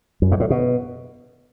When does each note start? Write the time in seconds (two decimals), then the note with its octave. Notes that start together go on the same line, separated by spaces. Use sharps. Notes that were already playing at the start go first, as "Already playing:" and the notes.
0.22 F#2
0.32 G#2
0.40 A2
0.50 B2